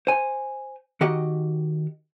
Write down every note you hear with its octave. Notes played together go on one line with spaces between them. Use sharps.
C5 G#5
D#3 F#4 G4 D#5